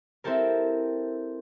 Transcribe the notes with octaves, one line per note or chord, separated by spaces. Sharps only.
C4 E4 G4 A4 A#4